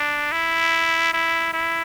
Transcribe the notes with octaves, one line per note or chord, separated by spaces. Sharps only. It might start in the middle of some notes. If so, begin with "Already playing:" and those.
Already playing: D4
E4
E4
E4